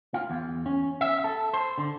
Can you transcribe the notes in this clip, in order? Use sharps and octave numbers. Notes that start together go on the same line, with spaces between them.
F4
E2
C#4
E5
A4
C5
D3